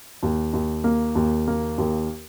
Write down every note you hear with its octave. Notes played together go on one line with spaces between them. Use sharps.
D#2
D#2
A#3
D#2
A#3
D#2